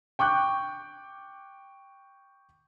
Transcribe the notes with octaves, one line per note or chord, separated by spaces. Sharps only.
G5 C#6 D6 F#6 G6